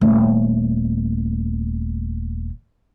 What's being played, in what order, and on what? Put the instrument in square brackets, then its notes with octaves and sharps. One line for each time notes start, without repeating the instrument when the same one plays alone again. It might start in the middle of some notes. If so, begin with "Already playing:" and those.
[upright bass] D#1 A3